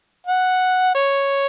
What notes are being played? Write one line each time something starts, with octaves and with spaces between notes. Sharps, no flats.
F#5
C#5